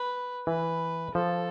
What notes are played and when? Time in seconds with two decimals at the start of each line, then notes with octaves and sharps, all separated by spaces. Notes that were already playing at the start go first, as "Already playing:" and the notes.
Already playing: B4
0.47 E3 B4
1.15 F3 A4